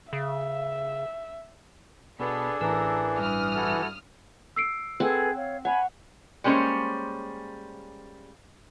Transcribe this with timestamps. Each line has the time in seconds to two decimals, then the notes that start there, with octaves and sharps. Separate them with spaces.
0.13 C#3 E5
2.20 B2 B3 D4 G#4 A4
2.61 A1 E3 A#4 E6
3.18 G2 D#6 F6
3.55 E4 F#4 A4
4.56 E6 C7 D7
5.00 C4 G#4 A4 B4 F#5 G#5
5.36 C#5 F5
5.65 C#5 F#5 G#5 B5
6.44 G3 G#3 A#3 C#4 C5 C#5